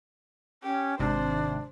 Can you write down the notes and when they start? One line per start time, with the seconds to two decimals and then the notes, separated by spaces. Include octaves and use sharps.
0.63 C#4 G4
0.99 G#1 C3 D4 C5